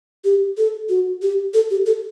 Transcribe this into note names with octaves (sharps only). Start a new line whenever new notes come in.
G4
A4
F#4
G4
A4
G4
A4